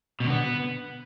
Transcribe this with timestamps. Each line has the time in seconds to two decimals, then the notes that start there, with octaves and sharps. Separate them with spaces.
0.20 B2
0.25 D3
0.30 B3